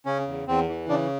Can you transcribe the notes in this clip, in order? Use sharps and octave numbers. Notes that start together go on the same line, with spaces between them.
C#3 C#4
E2
E2 C4
E3
C#3 D4